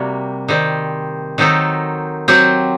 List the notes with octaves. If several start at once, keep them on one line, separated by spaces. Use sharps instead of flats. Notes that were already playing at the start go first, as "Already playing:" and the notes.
Already playing: C3 G3 A#3 F#4
D#3 G3 C4
D#3 F#3 C4 D#4 A4
F#3 C4 G4